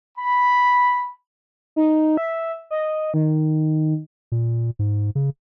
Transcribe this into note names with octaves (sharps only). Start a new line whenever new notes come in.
B5
D#4
E5
D#5
D#3
A#2
G#2
C#3